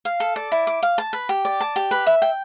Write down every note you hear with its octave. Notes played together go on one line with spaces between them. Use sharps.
F5
A4
D5
E4
D6
F5
A5
B4
G4
D5
A5
G4
B4
E5
G5